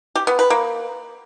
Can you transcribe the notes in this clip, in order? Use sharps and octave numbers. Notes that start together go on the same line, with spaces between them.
G4
B3
B4
A#3